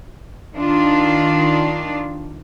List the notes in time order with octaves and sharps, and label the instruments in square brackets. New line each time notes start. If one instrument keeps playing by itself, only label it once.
[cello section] D#3 D4 F4